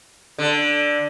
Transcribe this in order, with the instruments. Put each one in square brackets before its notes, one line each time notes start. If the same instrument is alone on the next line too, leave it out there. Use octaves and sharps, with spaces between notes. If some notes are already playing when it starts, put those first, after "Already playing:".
[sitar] D3